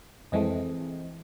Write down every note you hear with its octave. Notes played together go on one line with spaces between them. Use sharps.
F2 E3 G#3 A3 C4 D#5